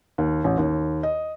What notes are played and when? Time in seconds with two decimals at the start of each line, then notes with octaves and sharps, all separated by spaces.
0.18 D#2
0.44 A1
0.58 D#2
1.03 D#5